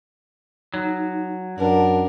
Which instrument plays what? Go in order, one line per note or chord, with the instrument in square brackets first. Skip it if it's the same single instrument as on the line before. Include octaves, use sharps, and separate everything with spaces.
[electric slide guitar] F#3 [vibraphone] D#4
[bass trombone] F#2 [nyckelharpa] D4 A#4 [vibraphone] F#5 A5